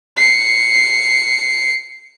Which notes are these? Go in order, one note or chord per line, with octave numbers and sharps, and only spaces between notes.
C7 C#7